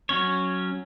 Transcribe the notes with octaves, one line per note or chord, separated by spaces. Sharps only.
F#3 C#4 C#5